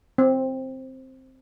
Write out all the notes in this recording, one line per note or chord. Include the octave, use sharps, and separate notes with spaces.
C4